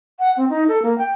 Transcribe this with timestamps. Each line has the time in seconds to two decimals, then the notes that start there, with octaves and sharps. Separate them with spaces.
0.19 F#5
0.37 C4
0.50 D#4
0.68 A4
0.82 A#3
0.98 G5